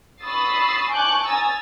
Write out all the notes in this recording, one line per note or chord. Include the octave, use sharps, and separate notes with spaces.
B5 C#6 D#6 E6 A6 C7
G#5 A5 C#6 D6 F#6 G6
G#5 A#5 D#6 E6 A6